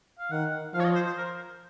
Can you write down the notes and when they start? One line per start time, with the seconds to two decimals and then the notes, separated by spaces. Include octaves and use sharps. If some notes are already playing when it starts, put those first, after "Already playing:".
0.19 F5
0.31 D#3 F#5
0.74 F3 F5
0.80 C#5
0.84 D#5
0.95 C5
1.06 C5
1.18 A#4